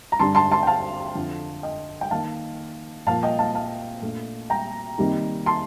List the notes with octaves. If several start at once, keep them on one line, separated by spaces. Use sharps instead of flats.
A#5
G2 D3 G3 D4 A5 C6
A5 C6
A5 C6
G5
F5 A5
F2 D3 F3
D#5 G5
G5
D#3 A#3 D#4 F5 A5
A#2 F3 A#3 F5 A5
D#5 G5
F5 A5
F5 A5
A#2 A3 D4
G5 A#5
C3 D#3 G3 A#3 D#4
A5 C6